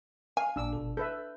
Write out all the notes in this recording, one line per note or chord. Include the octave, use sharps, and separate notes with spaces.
F5 G#5
A1 A#2 D4 D6 E6
G1 B2 A4
A4 B4 E5 G6